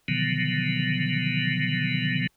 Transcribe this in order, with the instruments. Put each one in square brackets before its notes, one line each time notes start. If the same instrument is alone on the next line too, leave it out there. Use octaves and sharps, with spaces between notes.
[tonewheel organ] B2 D3 D#3 F3 F#3 B3